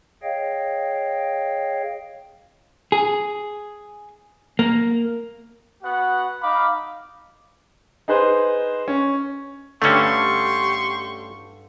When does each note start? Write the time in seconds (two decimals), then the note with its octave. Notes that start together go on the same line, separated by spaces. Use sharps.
0.23 G#4 C#5 D#5 F5 G5
2.92 G#4
4.59 A#3
5.83 B3 F#4 F#5
6.42 D#4 F5 B5 D6
8.08 D#4 G#4 B4 C5
8.88 C#4
9.82 G2 D3 A3 C#4 G4 C6 C#6